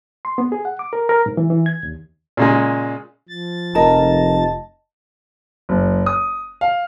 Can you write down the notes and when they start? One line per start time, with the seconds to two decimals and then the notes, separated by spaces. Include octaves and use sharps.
0.25 C6
0.38 B3
0.52 G#4
0.65 F#5
0.79 D6
0.93 A#4
1.09 A#4
1.26 G#2
1.37 E3
1.50 E3
1.66 G#6
1.83 D#2
2.37 A#2 C#3 G#3
3.29 F3 A6
3.75 F1 F4 A#4 D#5 A5
5.69 F#1
6.06 D#6
6.61 F5